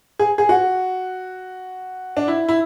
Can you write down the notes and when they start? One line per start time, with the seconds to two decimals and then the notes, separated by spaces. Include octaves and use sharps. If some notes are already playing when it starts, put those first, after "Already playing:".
0.19 G#4
0.38 G#4
0.49 F#4
2.17 D4
2.28 E4
2.48 E4